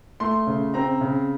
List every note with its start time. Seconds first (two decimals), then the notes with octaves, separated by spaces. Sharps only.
0.20 A3 C6
0.47 C#3
0.74 C4 A#5
1.01 C#3